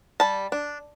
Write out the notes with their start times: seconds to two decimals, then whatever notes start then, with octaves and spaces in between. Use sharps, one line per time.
0.20 G3 A5
0.52 D4